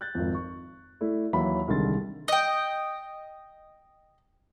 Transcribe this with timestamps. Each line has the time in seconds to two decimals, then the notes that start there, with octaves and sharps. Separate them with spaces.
0.01 F#6 G6 A6
0.15 G#1 F2
0.34 C#6
1.01 A3 E4 D5
1.33 D#2 E3 F#3 C#5 E5 B5
1.68 C2 D3 D#3 G#3 C6 A6
2.28 D#5 G5